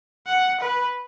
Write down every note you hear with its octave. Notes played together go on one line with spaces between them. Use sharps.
F#5
B4